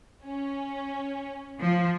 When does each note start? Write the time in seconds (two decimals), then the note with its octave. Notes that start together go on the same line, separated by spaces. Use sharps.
0.24 C#4
1.61 F3